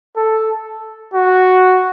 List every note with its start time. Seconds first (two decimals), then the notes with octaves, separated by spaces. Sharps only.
0.16 A4
1.14 F#4